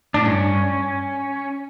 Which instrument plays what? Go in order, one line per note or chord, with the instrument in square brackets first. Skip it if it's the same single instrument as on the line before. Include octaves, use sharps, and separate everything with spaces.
[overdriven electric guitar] A2 [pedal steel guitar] D4
[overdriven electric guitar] G2 [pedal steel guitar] C#4